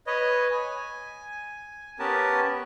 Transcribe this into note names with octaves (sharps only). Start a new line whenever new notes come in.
B4 C#5 D#5
G#5
B3 C#4 G4 A#4 B4 A5